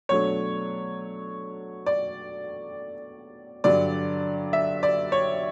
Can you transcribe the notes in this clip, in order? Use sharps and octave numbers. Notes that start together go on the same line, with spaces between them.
B2 F#3 A3 D4 C#5
D5
G2 D3 F#3 D5
E5
D5
C#5